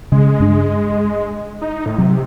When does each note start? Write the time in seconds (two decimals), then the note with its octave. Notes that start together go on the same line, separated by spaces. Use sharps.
0.12 C#3 G#3
0.40 G2 D4
1.61 D#4
1.86 A2
1.98 C3 F#3